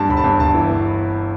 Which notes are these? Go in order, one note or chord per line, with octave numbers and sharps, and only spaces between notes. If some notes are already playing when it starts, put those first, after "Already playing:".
Already playing: G2 A5
G1 B5
A5
G2
G1 A5
E3
G1